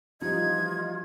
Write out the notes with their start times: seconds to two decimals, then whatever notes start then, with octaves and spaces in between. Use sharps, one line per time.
0.21 D2 E3 F3 G3 D#4 F4 D#5 G#6